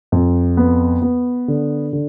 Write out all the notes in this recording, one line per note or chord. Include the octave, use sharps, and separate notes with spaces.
F2
B3
B3
D3
D3